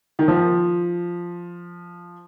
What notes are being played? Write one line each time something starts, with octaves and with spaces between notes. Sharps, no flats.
D#3
F3